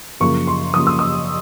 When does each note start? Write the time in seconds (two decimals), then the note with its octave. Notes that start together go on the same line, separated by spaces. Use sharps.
0.20 F#2 C#3 F3 A#3 C#6
0.47 C6
0.74 F#2 C#3 F3 A#3 D#6
0.87 E6
0.99 D#6